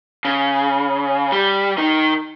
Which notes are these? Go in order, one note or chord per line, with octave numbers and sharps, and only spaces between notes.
C#3
G3
D#3 D#4